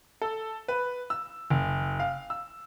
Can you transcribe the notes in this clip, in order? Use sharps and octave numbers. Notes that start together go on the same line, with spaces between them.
A4
B4
E6
F#1
F5
E6